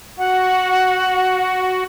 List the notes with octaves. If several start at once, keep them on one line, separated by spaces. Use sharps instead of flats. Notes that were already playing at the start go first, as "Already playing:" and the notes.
F#4 F#5